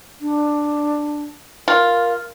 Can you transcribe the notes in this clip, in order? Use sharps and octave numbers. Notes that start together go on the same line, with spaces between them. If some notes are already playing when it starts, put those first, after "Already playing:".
D4
F4 A#4